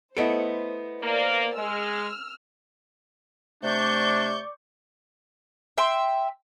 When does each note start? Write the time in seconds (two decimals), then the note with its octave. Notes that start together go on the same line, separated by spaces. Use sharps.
0.17 A3 B3 E4 A4 C5 D#5 D7
1.02 A#3 A#4 C5 D5
1.57 G#3 E6 F6
3.63 C3 A3 D4 D5 C#6 G6
5.78 E5 G5 C6